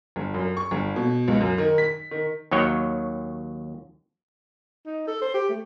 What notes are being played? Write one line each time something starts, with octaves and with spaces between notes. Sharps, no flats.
G1
F#2
C#6
G1
B2
C#2
F#2
D#3
B6
D#3
D#2 D#3 F#3 C#5 G5
D#4
A4
C5
G4
A3